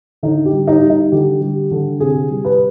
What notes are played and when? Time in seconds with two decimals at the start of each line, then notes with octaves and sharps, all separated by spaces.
0.23 D3 D#4
0.46 G4
0.52 G3
0.68 D#4
0.83 G3
0.90 D#4
1.12 D3 G4
1.41 G3
1.71 D3
2.00 C3 G#4
2.31 G3
2.45 B4